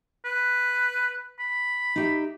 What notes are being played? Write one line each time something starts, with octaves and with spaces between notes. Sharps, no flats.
B4
B5
D#4 G4 E5